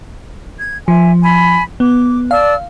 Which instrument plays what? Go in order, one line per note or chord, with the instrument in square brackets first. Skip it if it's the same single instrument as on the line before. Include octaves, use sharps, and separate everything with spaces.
[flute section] G#6
[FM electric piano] F3 [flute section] E5 G#5
[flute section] G#5 B5
[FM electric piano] B3 [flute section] D6
[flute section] D5 A5 E6 [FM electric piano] F5